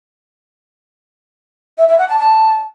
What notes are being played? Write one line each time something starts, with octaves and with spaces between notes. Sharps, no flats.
E5
E5
F#5
A5
A5